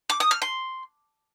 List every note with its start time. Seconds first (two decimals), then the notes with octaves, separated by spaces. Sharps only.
0.10 D6
0.20 D#6
0.31 F6
0.42 C6